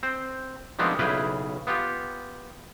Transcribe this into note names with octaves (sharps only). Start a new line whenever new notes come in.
C4 C5
D#3 F3 G#3 B3 C4 D4
B1 C#3 E4 G#4 B4 G5
B3 F4 G4